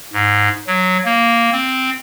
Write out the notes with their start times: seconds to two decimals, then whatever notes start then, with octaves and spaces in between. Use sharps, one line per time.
0.14 G#2
0.67 F#3
1.05 A#3
1.52 C4